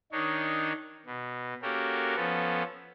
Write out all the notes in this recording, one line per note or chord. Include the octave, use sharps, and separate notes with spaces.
D#3 D4 D#4 C#5
B2
A#3 C#4 F#4 G4 A4 A#4
F3 B3 C#4 A4